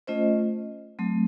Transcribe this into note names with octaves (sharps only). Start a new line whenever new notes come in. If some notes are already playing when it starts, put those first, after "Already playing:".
A3 C#4 F4 C5 D#5
F#3 A3 C4